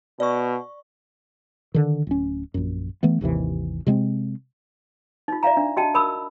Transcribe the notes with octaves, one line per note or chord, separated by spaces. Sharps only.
B2 D5 C#6
D3 D#3
D1 C#4
A#1 F#2
E3 A3 B3
G#1 D#2 C3 E3
C3 G#3 B3 C4
D#4 F4
D5 E5 F5 A#5
D4
F#4 D#5 G5 A5
A#4 B5 D#6 E6